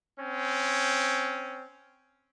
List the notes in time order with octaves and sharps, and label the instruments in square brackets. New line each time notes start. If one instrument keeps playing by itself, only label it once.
[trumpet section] C4 C#4